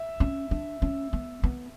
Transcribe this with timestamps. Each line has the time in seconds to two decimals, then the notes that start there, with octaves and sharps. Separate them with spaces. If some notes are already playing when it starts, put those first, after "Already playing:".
Already playing: E5
0.20 C#4
0.51 D4
0.82 C#4
1.13 B3
1.44 B3